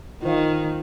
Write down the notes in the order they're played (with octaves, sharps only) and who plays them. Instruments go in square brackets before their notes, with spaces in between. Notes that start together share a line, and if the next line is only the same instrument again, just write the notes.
[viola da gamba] D#3 [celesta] F4 C5 F5